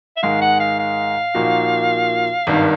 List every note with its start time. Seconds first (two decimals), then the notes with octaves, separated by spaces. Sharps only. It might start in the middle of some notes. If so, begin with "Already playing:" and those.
0.17 E5
0.23 G#2 D#3 G#3 F5
0.41 F#5
0.60 F5
0.79 F5
1.34 A#2 F3 A#3 D#4 F#4
2.47 G#1 G2 D#3